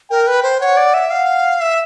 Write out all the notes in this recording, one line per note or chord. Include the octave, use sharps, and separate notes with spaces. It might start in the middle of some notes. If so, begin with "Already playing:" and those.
A#4 G5
B4
C5
C#5 F#5
D5
E5
F5 F#5
E5